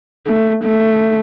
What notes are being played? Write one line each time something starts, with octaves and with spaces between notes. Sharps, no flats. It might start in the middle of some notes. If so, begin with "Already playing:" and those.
A3
A3